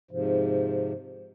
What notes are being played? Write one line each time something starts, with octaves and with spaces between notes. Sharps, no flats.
G#2 C3 F3